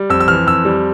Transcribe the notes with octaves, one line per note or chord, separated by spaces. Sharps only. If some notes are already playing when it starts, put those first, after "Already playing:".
Already playing: G3
F2 E6
E6
E3 F6
F2 E6
G3